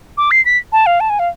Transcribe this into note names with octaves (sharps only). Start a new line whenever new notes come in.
D6
C7
B6
A5
F5
A5
G#5
F5